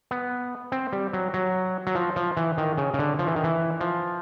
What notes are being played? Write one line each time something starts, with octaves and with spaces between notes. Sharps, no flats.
B3
C4
G3
F#3
F#3
F#3
F3
F3
E3
D#3
C#3
C#3
D3
F3
E3
D#3
E3
F3